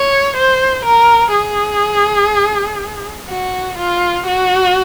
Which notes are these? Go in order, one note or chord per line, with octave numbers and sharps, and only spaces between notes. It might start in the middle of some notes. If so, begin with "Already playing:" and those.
Already playing: C#5
C5
A#4
G#4
F#4
F4
F#4